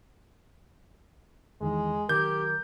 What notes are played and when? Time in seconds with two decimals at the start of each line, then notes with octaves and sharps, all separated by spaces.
1.61 E2 D#3 E3 G#3
2.09 D#3 F#3 G4 A#4 G6